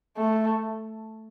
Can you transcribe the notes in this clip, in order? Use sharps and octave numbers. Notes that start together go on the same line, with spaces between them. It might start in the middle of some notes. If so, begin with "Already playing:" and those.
A3